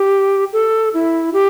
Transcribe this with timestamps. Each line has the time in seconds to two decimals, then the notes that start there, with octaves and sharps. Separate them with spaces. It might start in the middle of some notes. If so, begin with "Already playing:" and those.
Already playing: G4
0.53 A4
0.94 E4
1.34 G4